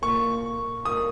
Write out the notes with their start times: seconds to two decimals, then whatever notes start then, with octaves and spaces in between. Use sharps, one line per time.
0.02 A#2 A#3 C#6
0.85 A#2 A#3 D#6